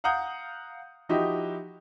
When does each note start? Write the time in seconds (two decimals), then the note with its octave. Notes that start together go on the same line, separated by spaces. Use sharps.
0.04 F5 F#5 A#5 D#6 G6
1.09 F3 D#4 E4 F#4 G4